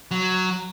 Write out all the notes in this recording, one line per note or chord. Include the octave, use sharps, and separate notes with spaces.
F#3